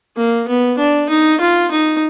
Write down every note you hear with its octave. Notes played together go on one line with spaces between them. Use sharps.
A#3
B3
D4
D#4
F4
D#4